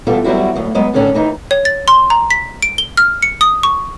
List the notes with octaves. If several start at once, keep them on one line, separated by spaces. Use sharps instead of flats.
B2 E3 G3 F4 A4
E2 F#3 G3 E4 F#4
D2 F#3
G2 F#3 G#3 B3 D#5
A2 D3 D#3 C#4 D4 A4
D#2 E3 D#4
C#5
A6
C6
A#5
B6
D7
G7
F6
C#7
D#6
C#6